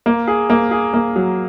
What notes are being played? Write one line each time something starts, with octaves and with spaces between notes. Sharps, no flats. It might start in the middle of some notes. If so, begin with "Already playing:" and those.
A#3
G#4
A#3
G#4
A#3
F#3